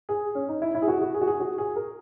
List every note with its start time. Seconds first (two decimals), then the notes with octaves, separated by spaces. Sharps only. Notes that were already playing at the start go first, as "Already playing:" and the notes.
0.09 G#4
0.35 C#4
0.49 D#4
0.62 E4
0.75 E4
0.82 G#4
0.88 F#4
1.02 F#4
1.14 G#4
1.21 F#4
1.27 G#4
1.40 F#4
1.58 G#4
1.76 A#4